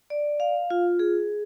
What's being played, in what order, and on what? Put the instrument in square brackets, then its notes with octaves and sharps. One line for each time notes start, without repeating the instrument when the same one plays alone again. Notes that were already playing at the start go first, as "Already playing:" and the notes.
[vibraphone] D5
F5
F4
G#4